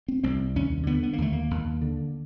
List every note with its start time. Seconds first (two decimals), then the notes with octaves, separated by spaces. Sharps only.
0.08 C4
0.24 C2 C4
0.56 D#2 C#4
0.87 D3 B3
1.03 B3
1.13 A#3
1.18 D#2 A3
1.33 A#3
1.51 D#2
1.82 D3